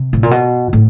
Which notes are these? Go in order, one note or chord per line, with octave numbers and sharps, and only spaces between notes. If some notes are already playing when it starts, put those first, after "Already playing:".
Already playing: C3
A2
A#2
B2
A2